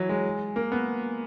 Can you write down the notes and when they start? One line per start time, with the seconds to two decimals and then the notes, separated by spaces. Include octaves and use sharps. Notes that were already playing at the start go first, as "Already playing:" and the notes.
Already playing: E3 F#3
0.09 G#3
0.56 A#3
0.72 B3